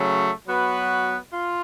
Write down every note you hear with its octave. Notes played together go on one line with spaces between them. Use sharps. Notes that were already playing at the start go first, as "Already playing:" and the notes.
Already playing: C#3 F#3 A3
F#3 B3 F#4 B4
F4